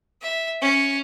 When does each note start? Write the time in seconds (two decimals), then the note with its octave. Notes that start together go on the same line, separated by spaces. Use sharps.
0.22 E5
0.61 C#4